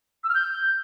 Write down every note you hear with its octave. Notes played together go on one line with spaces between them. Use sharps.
E6
F6
G6